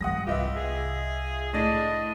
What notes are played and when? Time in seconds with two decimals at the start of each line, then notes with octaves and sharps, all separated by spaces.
0.01 G#1 G3 F#5 D#6 A#6
0.27 C2 C4 F4 G4 B4 D#5 E5
0.56 G#4
1.53 A2 D4 D#5 A6